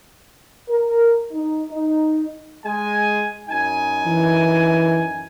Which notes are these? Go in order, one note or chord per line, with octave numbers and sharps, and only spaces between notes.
A#4
D#4
D#4
G#3 G#5
F#2 D#4 G#5
E3